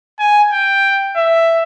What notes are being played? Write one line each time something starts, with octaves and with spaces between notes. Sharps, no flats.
G#5
G5
E5